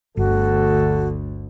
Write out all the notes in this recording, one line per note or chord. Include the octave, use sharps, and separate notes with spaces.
G1 D2 F#4 A4